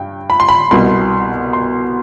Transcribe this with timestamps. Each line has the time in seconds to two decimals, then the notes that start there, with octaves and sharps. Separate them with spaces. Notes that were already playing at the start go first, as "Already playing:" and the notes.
Already playing: G2 G5
0.30 B5
0.40 C6
0.49 B5
0.71 C2 B2 G3 C6
1.53 C6